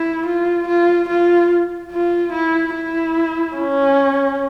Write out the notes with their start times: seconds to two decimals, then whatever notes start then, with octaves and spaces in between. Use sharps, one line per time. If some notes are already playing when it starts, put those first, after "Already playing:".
Already playing: E4
0.26 F4
0.68 F4
1.09 F4
1.91 F4
2.32 E4
2.74 E4
3.56 C#4